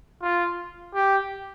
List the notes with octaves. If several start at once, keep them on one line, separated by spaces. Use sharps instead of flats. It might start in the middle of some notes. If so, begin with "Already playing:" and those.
F4
G4